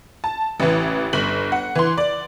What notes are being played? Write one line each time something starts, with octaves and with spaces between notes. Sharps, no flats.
A5
A1 E3
G1 F#7
F#5
E3 C6
D5